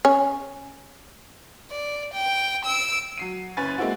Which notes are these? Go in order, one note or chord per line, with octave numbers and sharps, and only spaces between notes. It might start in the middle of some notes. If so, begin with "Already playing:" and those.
C#4
D5
G5
E6 D7
F#3 C7 D#7
F#1 C#4 B4 G#5 A6
G#3 A#3 C4 E4 F#4